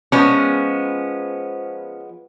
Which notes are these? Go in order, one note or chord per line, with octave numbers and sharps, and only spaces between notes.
F3 G#3 B3 C#4